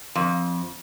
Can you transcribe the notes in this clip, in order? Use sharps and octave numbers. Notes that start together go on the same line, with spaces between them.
F2